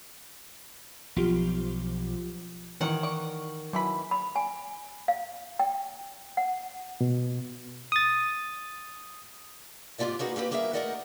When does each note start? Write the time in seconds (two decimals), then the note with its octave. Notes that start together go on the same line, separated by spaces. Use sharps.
1.16 B1 F3 F4 G4
2.81 D#3 E3 C#5 F#5
3.03 D5 C#6
3.73 B2 E3 F#3 B5
4.11 B5
4.36 G#5
5.08 F5
5.59 G5
6.37 F#5
7.01 B2
7.92 D#6 A6
9.98 G#2 C3 F4 G4 D5 D#5
10.19 A#3 D#4 F#4 G#4 B4
10.36 A#3 C4 G4 B4
10.51 G3 A#3 G#4 A#4 C#5 E5
10.73 A3 D#4 A#4 D5 D#5 F#5